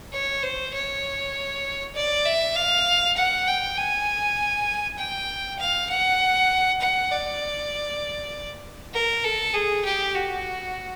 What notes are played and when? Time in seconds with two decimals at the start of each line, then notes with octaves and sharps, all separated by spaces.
0.13 C#5
0.43 C5
0.74 C#5
1.95 D5
2.26 E5
2.56 F5
3.17 F#5
3.47 G5
3.78 G#5
4.98 G5
5.59 F5
5.90 F#5
6.81 F#5
7.12 D5
8.94 A#4
9.24 A4
9.54 G#4
9.85 G4
10.14 F#4